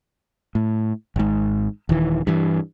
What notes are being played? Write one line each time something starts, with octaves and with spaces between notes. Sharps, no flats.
A2
G#1 G#2
D#1 D#3 E3
G2 E3